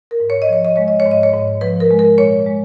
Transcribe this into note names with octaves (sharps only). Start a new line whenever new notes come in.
A#4
G#2
C#5
D#5
F3 C#5
D#5
G#3 C#5
D#5
C#5
G#2
D#5
C#5
G#2
F3 B4
A#4
G#3
A#4
A#2 C#5
G#3